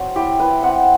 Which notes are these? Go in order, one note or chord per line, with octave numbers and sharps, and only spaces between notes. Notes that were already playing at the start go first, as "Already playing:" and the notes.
Already playing: F#3 C4
E4 G4
E4 B4
C4 F#5